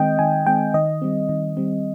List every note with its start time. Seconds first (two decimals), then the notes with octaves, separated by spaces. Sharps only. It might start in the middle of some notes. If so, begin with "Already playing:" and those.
Already playing: D#3 G#3 C4 D#5 G5
0.19 D#3 G#5
0.46 G#3 C4 G5
0.74 D#3 D#5
1.02 G3 C4
1.29 D#3
1.57 G3 C4